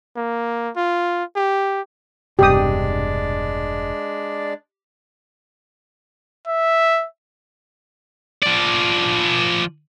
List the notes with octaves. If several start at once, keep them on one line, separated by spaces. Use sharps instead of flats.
A#3
F4
G4
E1 G2 C3 G#3 D4 G4 D5 D#6
E5
F3 D5